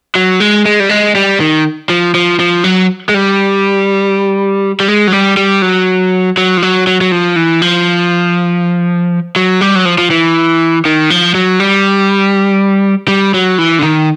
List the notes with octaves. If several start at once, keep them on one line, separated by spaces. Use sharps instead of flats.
F#3
G#3
G#3
G3
G#3
G3
D#3
F3
F3
F3
F#3
G#3
G3
G3
G#3
F#3
G3
G3
F#3
F#3
F3
F#3
F#3
F#3
F3
E3
F3
F#3
G3
F#3
F3
F3
E3
D#3
F3
F#3
G3
G3
F#3
E3
D3
D#3